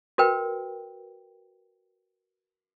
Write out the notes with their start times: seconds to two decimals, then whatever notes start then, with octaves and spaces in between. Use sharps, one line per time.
0.18 F#4 A#4 B4 G5